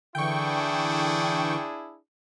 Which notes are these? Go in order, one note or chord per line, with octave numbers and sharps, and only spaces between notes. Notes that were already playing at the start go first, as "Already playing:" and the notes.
D3 E3 D4 E4 G#4 G5 C#6